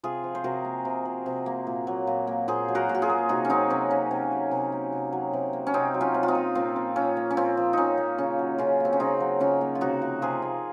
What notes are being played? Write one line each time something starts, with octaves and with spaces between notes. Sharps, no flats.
C3 F4 G#4
F3
C5
C3 F#4 A#4
A#3
C3
F3
C3
A#3
A#2
F#3
A#2
A#3
A#2 G#4 C5
F#3
F#4 A#4
A#2
F#4
F4 G#4
A#3
C3 D#4 F#4
C#4
F#3 C4 D#4
C3 C#4
A#3 C#4
C3
F#3
C3
A#3
C3
F#3
C3
A#3
C#4
C3 C4 D#4
F#3
C#4 F4
C3
F4
C4 D#4
A#3
A#2 C4
F3
A#2 C#4
A#3
C#4
A#2 C4
F3
A#2 C#4 D#4
A#3
C#3 C#4
F#3
C#3 C#4 F4
A#3 C4
C#4
C#3 C4 D#4
F#3
C#3 C#4 F4
A#3
F4
C3 D#4 F#4
F3
C3 F4 G#4
A#3